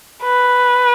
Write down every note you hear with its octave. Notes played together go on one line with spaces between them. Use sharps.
B4